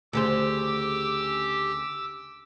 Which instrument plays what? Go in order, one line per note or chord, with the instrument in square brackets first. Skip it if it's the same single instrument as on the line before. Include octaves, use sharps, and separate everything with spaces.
[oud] D2 C#3 C5 [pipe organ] G4 [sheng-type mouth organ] D6 E6